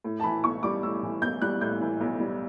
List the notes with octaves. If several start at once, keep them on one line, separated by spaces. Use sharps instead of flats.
A2
A5
E3 B5
B1 C#6
G3 D6
A2 E6
E3
B1 G6
G3 F#6
A2 G6
E3
B1
G3